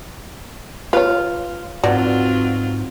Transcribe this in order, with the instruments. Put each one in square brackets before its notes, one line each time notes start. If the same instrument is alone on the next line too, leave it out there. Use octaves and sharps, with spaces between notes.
[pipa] F4 [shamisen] B4 C#5
[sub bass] G#2 [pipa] B2 [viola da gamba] F#3 C4 F4 [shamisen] D5